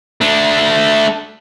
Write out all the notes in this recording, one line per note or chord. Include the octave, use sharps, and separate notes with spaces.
A3 D4